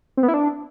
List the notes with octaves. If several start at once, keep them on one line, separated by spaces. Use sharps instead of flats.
C4
B3
E4
D4